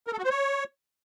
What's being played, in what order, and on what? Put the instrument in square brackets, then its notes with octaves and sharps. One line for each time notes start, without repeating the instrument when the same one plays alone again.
[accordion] A#4
A4
F#4
C5
C#5